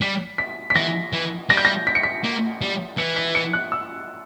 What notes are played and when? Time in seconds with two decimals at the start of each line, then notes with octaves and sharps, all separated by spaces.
0.01 G3 B6
0.38 B6
0.70 B6
0.75 E3 A#6
1.13 E3
1.49 G3 A#6
1.57 G6
1.65 A#6
1.87 B6
1.95 C#7
2.03 B6
2.24 A#3
2.62 G3
2.98 E3 C#7
3.16 B6
3.35 C#7
3.53 F#6
3.72 E6